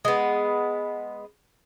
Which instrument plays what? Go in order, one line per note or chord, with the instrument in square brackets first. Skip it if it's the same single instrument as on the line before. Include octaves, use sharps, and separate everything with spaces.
[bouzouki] G#3 B3